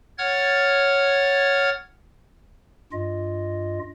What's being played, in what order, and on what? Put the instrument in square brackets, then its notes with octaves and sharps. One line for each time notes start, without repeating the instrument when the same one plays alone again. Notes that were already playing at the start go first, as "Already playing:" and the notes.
[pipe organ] C#5 F#5 F6 G#6 A6
G2 F4 D#5